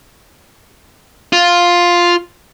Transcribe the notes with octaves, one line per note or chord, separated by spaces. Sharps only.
F4